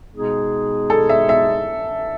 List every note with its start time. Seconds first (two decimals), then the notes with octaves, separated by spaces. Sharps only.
0.11 B2 G#3 B3 D#4 G#4
0.90 A4
1.09 E5
1.29 E5